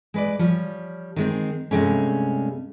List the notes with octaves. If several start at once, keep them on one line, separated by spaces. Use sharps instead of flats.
G#3 B4 D5
F3 G3 C#5
D#3 G#3 C4
G2 C3 G#3 A3 C#4